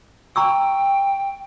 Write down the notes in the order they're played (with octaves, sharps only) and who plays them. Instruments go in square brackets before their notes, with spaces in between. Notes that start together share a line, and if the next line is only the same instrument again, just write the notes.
[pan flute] G5 [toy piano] A#5 C#6 E6